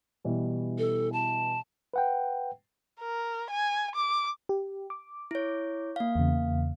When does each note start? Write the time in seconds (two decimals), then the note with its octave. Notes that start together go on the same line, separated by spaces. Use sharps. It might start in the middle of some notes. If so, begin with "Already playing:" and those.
0.24 B2 E3 G3
0.79 A4
1.12 A5
1.94 B4 F#5 G5
3.00 A#4
3.51 G#5
3.95 D6
4.49 G4
4.90 D6
5.31 E4 C#5
5.96 A#3 F5
6.15 E2 C#3